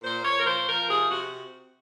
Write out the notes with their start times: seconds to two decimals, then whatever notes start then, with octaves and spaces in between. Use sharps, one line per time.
0.03 A#2 C5
0.24 A#2 C#5
0.40 A#4
0.45 F3 C5
0.67 F3 A#4
0.88 C3 G#4
1.09 C3 F#4